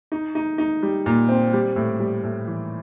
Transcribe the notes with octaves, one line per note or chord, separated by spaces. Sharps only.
D#4
D#4
D#4
G3
A#2
C4
G3
A2
G3
A2
E3